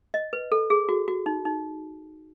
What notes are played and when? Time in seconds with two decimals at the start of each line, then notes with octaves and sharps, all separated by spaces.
0.14 D#5
0.33 B4
0.52 A4
0.70 G#4
0.89 F#4
1.08 F#4
1.26 D#4
1.45 D#4